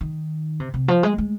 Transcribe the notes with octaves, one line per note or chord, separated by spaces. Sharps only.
D#3
C3
C3
F3
G#3
G#3